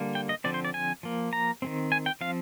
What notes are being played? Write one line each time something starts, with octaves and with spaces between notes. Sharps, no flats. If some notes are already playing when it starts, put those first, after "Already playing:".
Already playing: D3 G3 A#3
G5
D#5
D3 F3 C4 D5
C5
D5
G#5
F3 A#3
A#5
D#3 G#3 C4
G#5
G5
F3 C4 F5